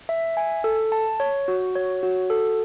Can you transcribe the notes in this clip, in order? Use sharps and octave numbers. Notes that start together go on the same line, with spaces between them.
E5
G#5
A4
A5
C#5
F#4
C#5
F#4
A4